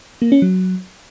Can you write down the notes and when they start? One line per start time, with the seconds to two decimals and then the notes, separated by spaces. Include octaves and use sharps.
0.22 A#3
0.32 C#4
0.42 F#3